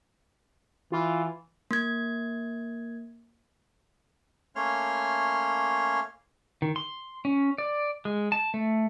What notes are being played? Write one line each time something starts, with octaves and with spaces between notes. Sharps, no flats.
E3 F4
A#3 G#6
A3 A#3 C#4 C#5 C6 F6
D#3
C6
C#4
D5
G#3
A5
A3